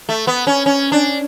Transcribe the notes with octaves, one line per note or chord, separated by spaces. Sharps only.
A3
B3
C#4
C#4
D4